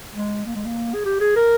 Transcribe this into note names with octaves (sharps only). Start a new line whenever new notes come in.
G#3
A#3
G#3
A#3
G#4
G4
G#4
A#4